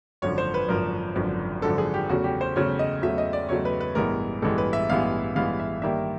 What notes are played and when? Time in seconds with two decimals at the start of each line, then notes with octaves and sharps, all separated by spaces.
0.22 G#1 F#2 D3 F3 C#5
0.38 C5
0.54 B4
0.68 G#1 F#2 D3 F3 A#4
1.15 G#1 F#2 D3 F3
1.62 G#1 F#2 D3 F3 A4
1.78 G#4
1.94 G4
2.09 E2 C#3 F#3 A3 F#4
2.24 G4
2.41 C5
2.56 E2 C#3 F#3 A3 C#5
2.79 D#5
3.02 E2 C#3 F#3 A3 E5
3.18 D#5
3.33 D5
3.49 E2 C#3 F#3 A3 C#5
3.65 B4
3.80 B4
3.95 A1 G2 E3 G#3 B3 A#4
4.42 A1 G2 E3 G#3 B3 A4
4.58 B4
4.73 E5
4.89 A1 G2 E3 G#3 B3 F5
5.35 A1 G2 E3 G#3 B3 F5
5.59 E5
5.82 G2 D#3 G3 A#3 E5